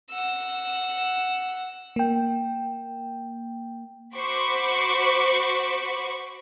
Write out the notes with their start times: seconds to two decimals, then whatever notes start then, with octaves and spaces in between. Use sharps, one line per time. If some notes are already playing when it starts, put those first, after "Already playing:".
0.10 F#5 E6
1.96 A#3 G5
4.15 F#4 C5 B5 C#6 D6